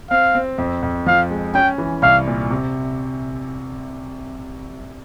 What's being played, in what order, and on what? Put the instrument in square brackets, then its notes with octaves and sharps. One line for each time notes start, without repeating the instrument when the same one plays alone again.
[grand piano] C4 [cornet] F5
[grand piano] C4
F2
F2
[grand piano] F3 [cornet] F5
[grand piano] G#3
[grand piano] C#4 [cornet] G5
[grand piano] E3
[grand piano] C2 [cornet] F5
[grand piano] A#2
C3